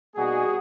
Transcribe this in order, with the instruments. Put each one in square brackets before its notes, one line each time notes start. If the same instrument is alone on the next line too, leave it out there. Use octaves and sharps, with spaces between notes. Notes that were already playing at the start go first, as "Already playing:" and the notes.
[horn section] B2 G3 A#3 D#4 F#4 G#4